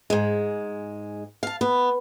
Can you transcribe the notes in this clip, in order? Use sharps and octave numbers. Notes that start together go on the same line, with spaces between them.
G#2 G#3
F5 A5
B3